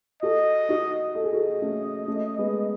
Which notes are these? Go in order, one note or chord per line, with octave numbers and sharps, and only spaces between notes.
F#4 A4 D#5
D#4 F#4
A4 D#5
G#4
F#4 A4
A3 C#4
A3 C#4
G#3 B3